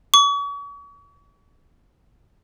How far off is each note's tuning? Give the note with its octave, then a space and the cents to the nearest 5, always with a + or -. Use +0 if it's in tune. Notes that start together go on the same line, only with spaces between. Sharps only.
C#6 +40